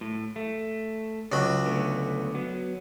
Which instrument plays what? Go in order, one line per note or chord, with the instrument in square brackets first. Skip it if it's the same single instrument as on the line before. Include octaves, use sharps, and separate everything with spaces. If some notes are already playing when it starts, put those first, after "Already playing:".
[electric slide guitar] A2
A3
[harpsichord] C#2 F#3 B5
[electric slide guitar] D3 A3 B3
F#3 B3